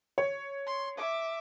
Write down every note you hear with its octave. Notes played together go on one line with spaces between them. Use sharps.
C#5
C6
E5 D6